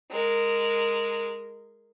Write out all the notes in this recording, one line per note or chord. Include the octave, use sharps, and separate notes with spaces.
G#3 A#4